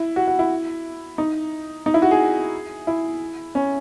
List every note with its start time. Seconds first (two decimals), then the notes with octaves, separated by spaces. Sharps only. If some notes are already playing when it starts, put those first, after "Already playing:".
Already playing: E4
0.16 F#4
0.28 F#4
0.39 E4
1.18 D#4
1.86 D#4
1.94 E4
2.02 F#4
2.11 G#4
2.87 E4
3.55 C#4